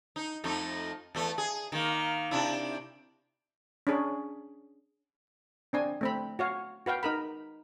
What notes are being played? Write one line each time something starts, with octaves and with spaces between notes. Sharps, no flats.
D#4
F2 A3 D#4
E2 A3
G#4
D#3 A#3
C3 D4 E4
C#4 D4 G#4
C4 D4 G#5
A3 C4 B5
F#4 C#5 F5
F#4 B4 F5 G5
D#4 A#4 B5